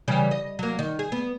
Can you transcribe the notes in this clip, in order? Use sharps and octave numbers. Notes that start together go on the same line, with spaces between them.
C#3 E3 G3
D#5
F#3 A#3
D#3
G#4
B3